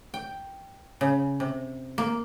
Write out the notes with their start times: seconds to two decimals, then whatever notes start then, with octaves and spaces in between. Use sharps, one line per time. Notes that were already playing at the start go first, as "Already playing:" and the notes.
0.14 G5
1.01 C#3
1.40 C3
1.98 A#3